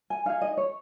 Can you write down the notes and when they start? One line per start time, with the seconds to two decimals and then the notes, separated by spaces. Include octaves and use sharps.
0.10 G#5
0.26 D#4 G#4 F5
0.41 D#5
0.57 C#5